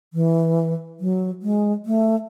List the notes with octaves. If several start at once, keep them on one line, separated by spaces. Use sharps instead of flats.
E3
F#3
G#3
A3